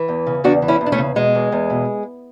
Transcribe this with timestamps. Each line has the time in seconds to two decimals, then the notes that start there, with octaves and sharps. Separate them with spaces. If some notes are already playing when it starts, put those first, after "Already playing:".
Already playing: E3
0.08 E2
0.27 C#3
0.44 E2 D4 F#4
0.62 E3
0.68 C#4 E4
0.81 E2
0.86 D4
0.92 A3 C#4
0.98 C#3
1.16 B2 G#3
1.35 E2
1.52 E2
1.70 B2